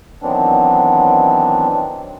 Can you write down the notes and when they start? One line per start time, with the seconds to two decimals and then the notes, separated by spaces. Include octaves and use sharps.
0.22 D#3 E3 F#3 B3 C4 D4